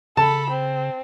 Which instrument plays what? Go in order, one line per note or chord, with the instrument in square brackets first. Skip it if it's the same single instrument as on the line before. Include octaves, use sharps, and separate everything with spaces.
[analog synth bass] C#3 [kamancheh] A4 B5 [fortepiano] A5
[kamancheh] C4